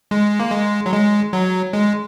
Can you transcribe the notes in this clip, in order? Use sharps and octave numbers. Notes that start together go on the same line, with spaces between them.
G#3
A#3
G#3
F#3
G#3
F#3
G#3